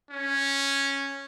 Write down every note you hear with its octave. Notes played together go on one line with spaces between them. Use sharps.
C#4